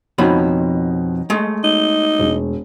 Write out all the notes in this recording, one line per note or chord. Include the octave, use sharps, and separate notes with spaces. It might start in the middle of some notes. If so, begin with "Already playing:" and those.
F2 B2 D#4 F#4 C#5 B5
G#3 A3
D#4
E1